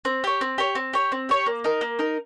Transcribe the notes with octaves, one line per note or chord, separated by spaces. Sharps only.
C4
G4 C#5
C4
G4 C#5
C4
G4 C#5
C4
G4 C#5
A#3
D#4 A#4
A#3
D#4 A#4